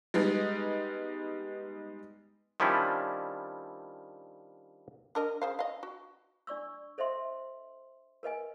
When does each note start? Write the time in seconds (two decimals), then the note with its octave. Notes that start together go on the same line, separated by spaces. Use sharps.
0.14 G3 G#3 B3 D#4
2.60 D#3 F3 G3 C#4 D4 E4
5.15 D4 A#4 D#5
5.42 C#3 C5 F5
5.59 D#5 F5
5.83 F#4
6.47 D4 D5 C#6 E6
6.98 A4 C5 D#5 E5 C6
8.23 A#4 B4 D#5 G#5